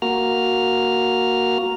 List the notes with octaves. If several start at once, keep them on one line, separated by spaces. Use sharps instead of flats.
A#3 F#4 A#5 F6